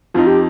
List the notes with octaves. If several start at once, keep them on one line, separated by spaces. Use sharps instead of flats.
F2 F3 D#4 F4
G4